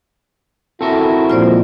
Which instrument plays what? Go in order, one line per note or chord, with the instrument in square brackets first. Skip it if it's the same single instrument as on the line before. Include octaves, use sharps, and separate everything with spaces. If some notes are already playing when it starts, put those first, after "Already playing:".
[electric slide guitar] C4 F#4 A#4 [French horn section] E4 [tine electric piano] A4
[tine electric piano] A#2 F3 G#3 [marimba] F4 C5 D5